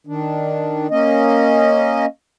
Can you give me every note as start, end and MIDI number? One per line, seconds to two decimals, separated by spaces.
0.07 0.87 51
0.07 0.87 62
0.91 2.06 58
0.91 2.06 61
0.91 2.06 75